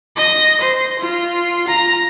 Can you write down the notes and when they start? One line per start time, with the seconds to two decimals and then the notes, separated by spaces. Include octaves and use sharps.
0.16 D#5 A#6
0.61 C5
0.99 F4
1.68 A#5